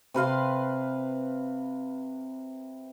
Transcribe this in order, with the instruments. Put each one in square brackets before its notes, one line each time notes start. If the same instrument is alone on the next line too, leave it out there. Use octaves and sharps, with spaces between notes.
[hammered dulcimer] C3 B4 F5 C6